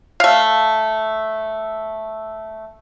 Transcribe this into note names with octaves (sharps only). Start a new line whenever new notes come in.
A3 F5